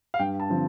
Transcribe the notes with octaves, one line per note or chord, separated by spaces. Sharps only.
F5
G2 G5
A5
D3 F3 C4